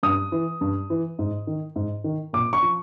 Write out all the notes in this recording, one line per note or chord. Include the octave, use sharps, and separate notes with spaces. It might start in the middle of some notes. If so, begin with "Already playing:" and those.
G2 D#6
E3
G2
E3
G#2
D#3
G#2
D#3
A#2 D6
C#6
F3